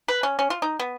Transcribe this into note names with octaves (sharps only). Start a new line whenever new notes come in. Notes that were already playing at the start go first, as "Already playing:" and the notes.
B4
C#4
C#4
F4
D#4
B3